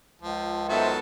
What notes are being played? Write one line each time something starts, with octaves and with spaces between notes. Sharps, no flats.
C#2 F3
D#3 F#3 B3 A4 C5 E5 A5